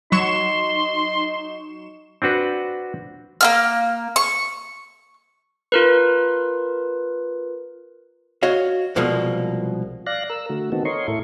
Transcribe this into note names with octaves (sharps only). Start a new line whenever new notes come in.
F#3 D#4 C6 C#6 E7
C4 D4 F#4 B4
A#3 F4 F6
C#6
F4 A#4 B4
F#4 C#5 D#5 F5
C2 B2 F3 G#3 A#3
D5 F5 F#6 A#6
A#4 E6
D3 A3 F#4
D#3 B3 C4 D#4 F#4 A4
A#4 C#5 D#5 C6 C#6
A2 E4 A4 C#6